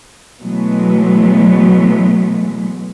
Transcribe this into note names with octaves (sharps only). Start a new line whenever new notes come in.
B2 E3 F#3 G#3 A3 B3